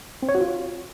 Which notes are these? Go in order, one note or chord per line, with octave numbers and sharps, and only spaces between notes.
C4
C#5
F#4
F4